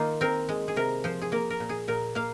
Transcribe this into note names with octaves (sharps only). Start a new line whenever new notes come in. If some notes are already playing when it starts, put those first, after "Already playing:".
Already playing: D#3 A#3 D#4 F4
C4 A#4
G#3
G#4
C3 A#4
F3 C5
G#4
A#3 A#4
A#4
A#2
G#4
A#2 A#4
A#3 F5